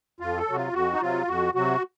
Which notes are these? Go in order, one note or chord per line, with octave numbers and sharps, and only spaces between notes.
F2 F4
A4
C3 F#3 F#4
F4
F2 F#4
D#4
C3 F#3 F4
F2 F#4
C3 F#3 F#4